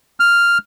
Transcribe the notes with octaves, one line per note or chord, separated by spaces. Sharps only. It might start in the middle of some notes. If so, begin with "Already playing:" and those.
F6